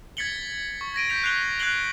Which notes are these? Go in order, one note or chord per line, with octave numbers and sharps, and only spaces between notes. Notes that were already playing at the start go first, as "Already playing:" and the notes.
G#6 A6 B6 C#7 F#7 G7
C#6
G#6 A#6 D7 D#7
G6 B6 F7
F#6 C7 F7 G7
F#6 G#6 C7 F#7 G7